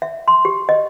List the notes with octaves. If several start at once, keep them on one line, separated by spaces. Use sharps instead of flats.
E5
C6
G4
D#5